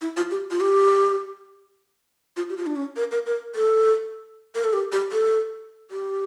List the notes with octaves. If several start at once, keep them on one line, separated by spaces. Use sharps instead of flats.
E4
F4
G4
F4
G4
F4
G4
F4
D4
C#4
A#4
A#4
A#4
A4
A#4
A4
G4
G4
A4
G4